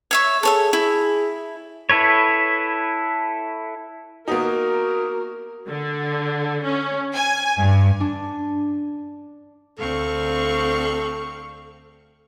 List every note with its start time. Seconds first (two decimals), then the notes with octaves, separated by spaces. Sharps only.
0.11 C#5 E5 C#6
0.43 G#4 A4 C#5 E5
0.73 E4
1.90 E4 A4 B4 C#5
4.28 A#3 B3 D#4 F#4 A#4
5.68 D3
6.64 C#4
7.13 G#5
7.60 G2
8.00 D4
9.79 D2 C4 A4 F5 C#6